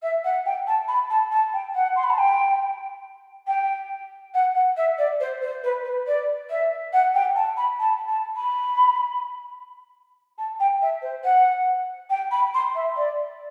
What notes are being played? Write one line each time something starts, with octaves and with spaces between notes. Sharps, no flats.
E5
F#5
G5
A5
B5
A5
A5
G5
F#5
C6
B5
A5
G5
G5
F#5
F#5
E5
D5
C5
C5
B4
B4
D5
E5
F#5
G5
A5
B5
A5
A5
B5
A5
G5
E5
C5
F#5
G5
B5
C6
E5
D5